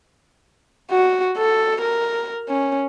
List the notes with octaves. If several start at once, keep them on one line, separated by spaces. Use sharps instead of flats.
F#4
A4
A#4
C#4